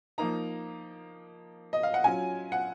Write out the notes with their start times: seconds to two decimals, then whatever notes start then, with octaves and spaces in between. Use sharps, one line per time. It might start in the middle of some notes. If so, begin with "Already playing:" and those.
0.18 F3 A#3 D#4 A#5
1.73 D#5
1.83 F5
1.94 F#5
2.04 F#3 C#4 F4 G#5
2.52 F#5